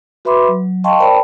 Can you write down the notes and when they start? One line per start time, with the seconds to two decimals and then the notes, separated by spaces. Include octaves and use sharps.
0.25 F#4 B4 E5 B5 C6 D6
0.48 F#3
0.84 D#5 F5 G5 A5 C6 C#6
1.00 A#4 C5 D5 G5 A5 B5